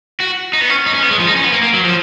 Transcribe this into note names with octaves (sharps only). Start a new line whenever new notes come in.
F#4
D#4
B3
C#4
D#4
C#4
B3
G#3
F3
D#4
C#4
B3
A#3
A#3
F#3
F3